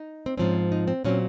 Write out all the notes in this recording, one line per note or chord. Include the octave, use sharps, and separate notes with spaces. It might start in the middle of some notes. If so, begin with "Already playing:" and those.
Already playing: D#4
C4
G#2 F3 C4 C#4
D#4
C4
A#2 F#3 C4 C#4